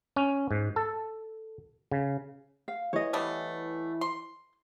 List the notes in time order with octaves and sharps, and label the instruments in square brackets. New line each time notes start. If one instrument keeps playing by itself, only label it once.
[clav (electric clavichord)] C#4
G#2
A4
C#3
[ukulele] F5
[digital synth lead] E3 [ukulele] C#5 D#5
[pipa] G3 A3 B3
C6